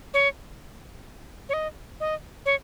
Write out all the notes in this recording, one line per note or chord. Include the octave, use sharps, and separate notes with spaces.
C#5
C#5
D#5
D#5
C#5